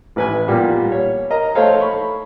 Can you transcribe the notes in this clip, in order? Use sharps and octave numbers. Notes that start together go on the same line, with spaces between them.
A1 B4 G#5
A#2 G3 B3
C#5
A#4 D#5 A#5
A3 C5 C#5 F5
B5 C#6